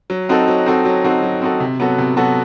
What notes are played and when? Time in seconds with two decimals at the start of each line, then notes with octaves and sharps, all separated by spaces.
0.10 F#3
0.29 C4 D#4 F#4 A4
0.48 F#3
0.66 C4 D#4 F#4 A4
0.85 F#3
1.04 C4 D#4 F#4 A4
1.22 F#3
1.42 C4 D#4 F#4 A4
1.60 C3
1.80 F#3 B3 F#4 A4
1.98 C3
2.17 F#3 B3 F#4 A4